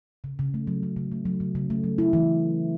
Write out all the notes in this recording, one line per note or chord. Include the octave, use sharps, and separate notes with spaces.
C#3
C#3
A3
F#3
C#3
C#3
A3
F#3
C#3
C#3
A3
F#3
E4
E3